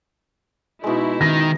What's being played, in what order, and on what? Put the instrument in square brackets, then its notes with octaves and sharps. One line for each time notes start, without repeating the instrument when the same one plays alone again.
[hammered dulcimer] B2 G#3 [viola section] D#4 E4
[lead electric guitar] D#3 [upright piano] A#6